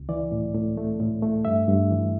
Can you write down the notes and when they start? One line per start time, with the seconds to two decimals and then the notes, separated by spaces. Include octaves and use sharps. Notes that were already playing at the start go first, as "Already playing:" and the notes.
Already playing: C#2
0.09 E3 D5
0.32 A2
0.55 A2
0.77 A3
1.00 A2
1.23 A3
1.45 G2 E5
1.68 G2
1.91 E3